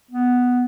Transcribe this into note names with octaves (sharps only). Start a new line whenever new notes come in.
B3